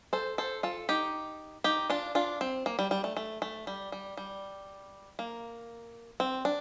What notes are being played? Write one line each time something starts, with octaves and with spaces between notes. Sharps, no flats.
A4 C5
A4 C5
F4 A4
D#4 G4
D#4 G4
D4 F4
D4 F4
C4
A#3
G3
G3
A3
A3
A3
G3
G3
G3
A#3
C4
D4